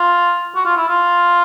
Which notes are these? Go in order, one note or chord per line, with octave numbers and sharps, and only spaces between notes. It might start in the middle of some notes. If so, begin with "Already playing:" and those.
Already playing: F4
F#4
F4
E4
F4